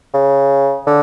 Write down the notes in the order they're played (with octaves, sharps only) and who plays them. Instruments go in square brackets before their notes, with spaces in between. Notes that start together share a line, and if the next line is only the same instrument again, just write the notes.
[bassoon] C#3
D3